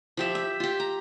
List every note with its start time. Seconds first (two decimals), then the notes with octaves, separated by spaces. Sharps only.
0.17 F3 G4 E5
0.35 E5
0.60 F4 G4
0.80 A#5